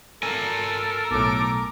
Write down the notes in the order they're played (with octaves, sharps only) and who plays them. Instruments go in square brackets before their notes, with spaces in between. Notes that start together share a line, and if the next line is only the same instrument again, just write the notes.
[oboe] A4 [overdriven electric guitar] A#4 G#5
[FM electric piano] B1 A2 [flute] D6